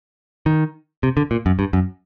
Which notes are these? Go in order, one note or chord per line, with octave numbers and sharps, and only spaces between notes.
D#3
C3
D3
A#2
F#2
G2
F#2